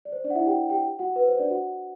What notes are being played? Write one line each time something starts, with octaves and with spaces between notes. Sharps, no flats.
D5
C5
D4 D5
F#5
E4 E5
G4 G5
G4 G5
F#4 F#5
B4
C5
D4 D5
F#4 F#5